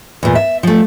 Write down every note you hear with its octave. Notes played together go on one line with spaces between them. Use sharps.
E2 A#2
E5
F3 A3